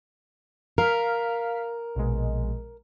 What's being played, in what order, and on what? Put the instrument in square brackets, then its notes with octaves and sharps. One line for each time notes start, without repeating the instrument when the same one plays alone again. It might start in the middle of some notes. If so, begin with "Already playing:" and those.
[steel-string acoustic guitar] A#4 [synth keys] F5 F6 B6
[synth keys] A#1 B2 G#3